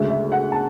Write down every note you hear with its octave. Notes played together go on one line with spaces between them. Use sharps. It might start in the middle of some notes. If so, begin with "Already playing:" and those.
Already playing: D2 C#3 G#3 E5
E5
F#5
A5